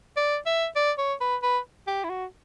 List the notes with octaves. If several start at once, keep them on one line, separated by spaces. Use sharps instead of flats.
D5
E5
D5
C#5
B4
B4
G4
E4
F#4